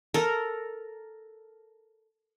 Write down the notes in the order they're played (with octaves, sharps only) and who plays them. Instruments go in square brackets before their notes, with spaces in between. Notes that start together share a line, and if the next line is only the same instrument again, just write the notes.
[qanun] A4 A#4